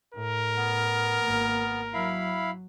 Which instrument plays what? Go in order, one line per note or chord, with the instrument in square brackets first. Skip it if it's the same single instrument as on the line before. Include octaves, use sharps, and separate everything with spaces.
[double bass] A2 [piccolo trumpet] A#4
[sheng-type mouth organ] B3 F6
[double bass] G#1 A#3
[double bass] F#3 [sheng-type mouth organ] E4 F5 B5